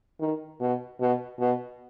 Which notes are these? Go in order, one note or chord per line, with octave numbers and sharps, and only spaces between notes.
D#3
B2
B2
B2